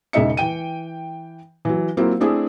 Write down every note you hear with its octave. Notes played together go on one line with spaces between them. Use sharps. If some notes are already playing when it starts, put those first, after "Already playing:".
E1 C#3 G#3 D#4 E5 C#7
E3 G5 D#7
E3 F#3
F#3 A#3 C4 E4 F4
A3 C4 D4 E4 G#4